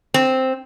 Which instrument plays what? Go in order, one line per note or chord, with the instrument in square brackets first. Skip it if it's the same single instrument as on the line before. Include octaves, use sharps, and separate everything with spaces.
[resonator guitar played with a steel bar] C4